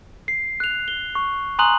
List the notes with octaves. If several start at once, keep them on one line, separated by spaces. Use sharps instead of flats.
C7
F#6 F7
G7
C#6
G#5 A#5 C6 D#6 F#6 F#7